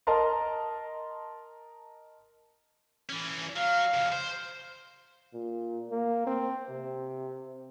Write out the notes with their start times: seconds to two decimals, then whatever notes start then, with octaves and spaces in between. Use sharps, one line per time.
0.07 A#4 D#5 A5 A#5 C6
3.09 E3 C#4
3.56 F#3 F5
3.94 F2 C#3
4.12 C5
5.34 A#2
5.91 A#3
6.27 C4
6.69 C3